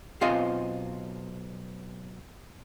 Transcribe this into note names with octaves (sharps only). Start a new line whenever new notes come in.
B1 C4 F4 C5 D#5 G#5